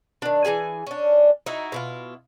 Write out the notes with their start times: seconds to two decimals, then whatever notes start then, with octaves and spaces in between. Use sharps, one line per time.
0.22 D#3 D4
0.45 E3 E4 G#4 G#5
0.87 C#4 D4
1.46 D#4 E4 F#4
1.72 B2 E4 F4